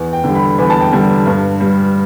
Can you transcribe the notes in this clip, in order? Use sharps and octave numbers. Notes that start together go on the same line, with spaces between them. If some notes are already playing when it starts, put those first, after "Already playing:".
Already playing: E2
G5
D3 G3
B5
E2 B5
A5
G5
D3 G3 A5
G2
G3